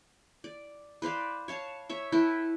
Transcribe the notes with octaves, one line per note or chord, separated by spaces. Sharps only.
D5
B4 C5 D5 F5
C#5 F5 A5
C#5 E5
E4 A4 B4 G5